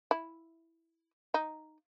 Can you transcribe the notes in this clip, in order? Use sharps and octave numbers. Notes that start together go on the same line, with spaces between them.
E4
D#4